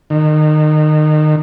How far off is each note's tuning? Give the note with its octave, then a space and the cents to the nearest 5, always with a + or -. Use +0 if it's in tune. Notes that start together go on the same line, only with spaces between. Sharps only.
D#3 -25